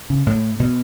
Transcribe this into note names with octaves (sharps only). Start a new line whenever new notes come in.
C#3
A2
B2